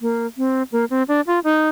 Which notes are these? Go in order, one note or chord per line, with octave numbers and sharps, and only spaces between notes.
A#3
C4
A#3
C4
D4
F4
D#4